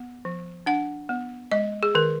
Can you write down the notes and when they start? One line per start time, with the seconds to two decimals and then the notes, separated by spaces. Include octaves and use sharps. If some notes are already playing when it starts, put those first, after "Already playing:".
Already playing: B3
0.25 F3
0.66 D4 F#5
1.09 B3
1.52 G#3 D#5
1.83 G#4
1.95 D#3 A#4